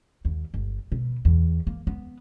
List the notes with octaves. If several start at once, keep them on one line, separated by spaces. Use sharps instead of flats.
D#2
G1
B2
E2
A#3
B3